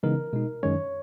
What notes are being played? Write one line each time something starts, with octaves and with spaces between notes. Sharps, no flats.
C#3 E3 G#3 B3 D#4 A#4
B2 G#3 D#4
F#2 D#3 G#3 C#4 C#5